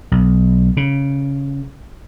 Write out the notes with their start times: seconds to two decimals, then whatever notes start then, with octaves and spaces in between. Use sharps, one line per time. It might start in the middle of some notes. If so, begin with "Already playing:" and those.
0.12 B1
0.77 C#3